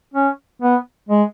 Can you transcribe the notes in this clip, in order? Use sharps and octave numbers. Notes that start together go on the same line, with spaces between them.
C#4
B3
G#3